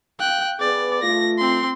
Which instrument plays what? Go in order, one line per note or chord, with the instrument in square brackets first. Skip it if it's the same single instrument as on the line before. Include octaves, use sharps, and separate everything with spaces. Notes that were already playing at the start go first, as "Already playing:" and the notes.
[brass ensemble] F5 [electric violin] G5 F#6
[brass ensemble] B3 G#4 B4 [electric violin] D5
[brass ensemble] A3 F4 [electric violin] A#6
[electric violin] C4 C6